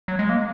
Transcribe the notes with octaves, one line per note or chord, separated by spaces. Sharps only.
F#3
G#3
A#3